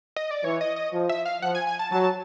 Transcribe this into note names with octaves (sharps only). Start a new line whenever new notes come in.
D#5
D5
E3 C#5
D#5
D#5
F3
E5
F5
F3 F#5
G#5
G#5
A5
F#3 A5